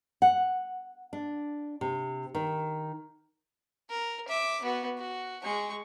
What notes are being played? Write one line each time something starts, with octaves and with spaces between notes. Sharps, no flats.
F#5
D4
C3
D#3
A#4
E5 D6
B3 F#4
F#4
G#3 C#6